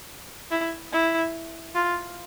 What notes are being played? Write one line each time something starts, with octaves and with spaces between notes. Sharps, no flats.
E4
E4
F4